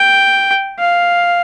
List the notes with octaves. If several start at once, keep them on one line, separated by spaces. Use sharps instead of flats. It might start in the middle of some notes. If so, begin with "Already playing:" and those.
Already playing: G5
F5